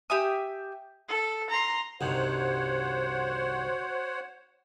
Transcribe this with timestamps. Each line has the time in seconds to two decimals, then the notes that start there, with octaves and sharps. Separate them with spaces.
0.10 G4 E5 G#5 D#6
1.08 A4
1.50 A#5 C6
2.01 C2 G2 D#3 F#4 C5 C#5 F#5